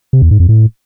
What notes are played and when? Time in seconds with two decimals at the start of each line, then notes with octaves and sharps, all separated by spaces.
0.13 C3
0.22 E2
0.31 G#2
0.40 F2
0.49 A2